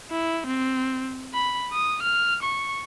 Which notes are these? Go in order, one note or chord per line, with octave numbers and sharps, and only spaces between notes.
E4
C4
B5
D#6
F6
C#6